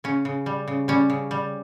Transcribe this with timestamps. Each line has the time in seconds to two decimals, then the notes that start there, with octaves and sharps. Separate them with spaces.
0.04 C#3 C#4
0.25 C#3
0.46 G3
0.68 C#3
0.88 G3 C#4
1.10 C#3
1.31 G3